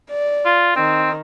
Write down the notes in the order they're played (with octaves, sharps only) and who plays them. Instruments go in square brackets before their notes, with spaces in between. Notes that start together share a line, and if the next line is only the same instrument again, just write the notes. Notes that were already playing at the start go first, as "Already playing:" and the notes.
[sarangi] D5
[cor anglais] F4
[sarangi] D#3 [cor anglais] C4